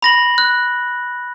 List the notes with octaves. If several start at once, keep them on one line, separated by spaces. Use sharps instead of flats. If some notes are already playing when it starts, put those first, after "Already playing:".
B5 A#6 F#7
F#6